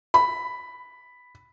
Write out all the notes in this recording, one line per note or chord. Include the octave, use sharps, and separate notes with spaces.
B5